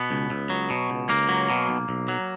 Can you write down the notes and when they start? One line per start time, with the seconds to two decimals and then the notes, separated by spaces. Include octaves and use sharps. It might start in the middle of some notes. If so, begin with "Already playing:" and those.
Already playing: B2 B3
0.11 C#2
0.30 C#2
0.50 F#3
0.70 B2
0.90 C#2
1.09 C#2 A#3
1.29 F#3
1.50 B2
1.69 B1
1.89 B1
2.08 F#3